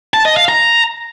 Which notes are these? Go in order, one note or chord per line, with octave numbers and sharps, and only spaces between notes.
A5
D#5
F5
A#5